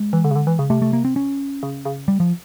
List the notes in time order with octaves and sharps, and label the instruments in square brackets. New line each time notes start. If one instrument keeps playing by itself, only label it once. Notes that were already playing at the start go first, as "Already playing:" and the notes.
Already playing: [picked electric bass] G#3
[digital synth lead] E3
D3
C#3
D3
E3
C#3
[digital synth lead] C3 [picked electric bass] A3
[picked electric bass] A3
A#3
C4
C#4
[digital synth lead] C#3
C#3
[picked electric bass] G3
F3